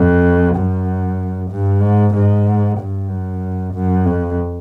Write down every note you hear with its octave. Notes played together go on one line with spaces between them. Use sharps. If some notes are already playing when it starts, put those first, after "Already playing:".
Already playing: F2
F#2
G2
G#2
G#2
G2
F#2
F#2
F2